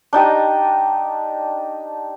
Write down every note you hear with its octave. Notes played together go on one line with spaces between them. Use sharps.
D4 D#4 G4 D#5